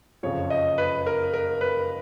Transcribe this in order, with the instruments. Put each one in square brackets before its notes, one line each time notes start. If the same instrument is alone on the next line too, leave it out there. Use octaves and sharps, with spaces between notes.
[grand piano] F#1 F2 C#3 F3 C#5
D#5
B4
A#4
A#4
B4